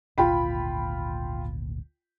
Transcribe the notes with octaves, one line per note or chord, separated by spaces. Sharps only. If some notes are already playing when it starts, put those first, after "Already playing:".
G#1 D2 A#2 F4 G5 B5